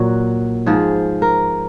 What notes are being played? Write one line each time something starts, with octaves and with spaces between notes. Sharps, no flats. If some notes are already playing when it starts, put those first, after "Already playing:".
Already playing: A#2 F#3 F#4
G#2 F3 G#4
A#4